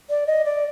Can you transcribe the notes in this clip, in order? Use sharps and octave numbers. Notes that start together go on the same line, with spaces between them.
D5
D#5
D5